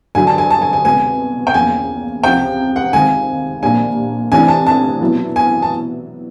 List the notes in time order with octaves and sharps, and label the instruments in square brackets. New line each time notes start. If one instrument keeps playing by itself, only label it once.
[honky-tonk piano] G2 D3 F#3 [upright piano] G#5
[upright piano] A5
G#5
A5
G#5
G#5
[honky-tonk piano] C2 B2 G#3 B3 [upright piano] G#5
[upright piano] G5
[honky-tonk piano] E2 C#3 F3 A#3 [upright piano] G#5
[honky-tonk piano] C#2 C3 F3 [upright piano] G5
[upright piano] F#5
[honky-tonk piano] C3 D#3 G#3 C4 F4 [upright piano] G#5
[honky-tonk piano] A#1 A#2 G3 A#3 D4 [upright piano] G#5
[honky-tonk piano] C3 E3 A3 D4 [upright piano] G#5
[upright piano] A5
A5
[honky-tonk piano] B2 F#3 B3 E4
[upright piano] G#5
A5